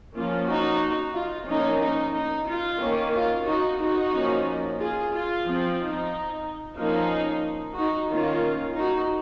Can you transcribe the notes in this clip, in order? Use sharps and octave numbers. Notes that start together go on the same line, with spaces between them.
F3 A#3 C#4 F4
D#4 F#4
F4
F3 A#3 C#4 D#4
D#4
D#4
F4
D#3 A#3 C#4
F4
D#4 F#4
D#4 F#4
F3 A#3 C#4
F4 G#4
F4
F3 C4
D#4
F3 A#3 C#4 D#4
D#4 F#4
D#3 A#3 C#4 F4
D#4 F#4